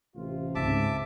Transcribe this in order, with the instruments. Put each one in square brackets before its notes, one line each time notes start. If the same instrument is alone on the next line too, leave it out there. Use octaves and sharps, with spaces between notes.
[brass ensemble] A1 C3 F4
[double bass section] C#2 C4 [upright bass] G#2 [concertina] E5 A5 D6